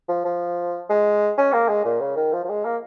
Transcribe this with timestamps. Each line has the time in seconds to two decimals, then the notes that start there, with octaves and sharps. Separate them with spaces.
0.08 F3
0.24 F3
0.89 G#3
1.37 C#4
1.52 A#3
1.68 G#3
1.84 A#2
2.00 C#3
2.16 D#3
2.32 F3
2.44 F3
2.49 G#3
2.65 A#3